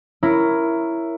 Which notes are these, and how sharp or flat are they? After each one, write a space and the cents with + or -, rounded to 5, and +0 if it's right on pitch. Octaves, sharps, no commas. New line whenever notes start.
E4 +10 A#4 +0 C#5 +0